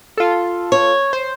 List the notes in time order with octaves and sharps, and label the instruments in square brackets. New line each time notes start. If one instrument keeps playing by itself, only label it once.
[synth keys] F4 A4
[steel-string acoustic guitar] C#5
[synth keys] C5